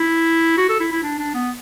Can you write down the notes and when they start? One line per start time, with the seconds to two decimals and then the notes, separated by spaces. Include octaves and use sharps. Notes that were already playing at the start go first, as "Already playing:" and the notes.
Already playing: E4
0.57 F#4
0.69 A4
0.80 E4
0.92 E4
1.03 D4
1.19 D4
1.34 B3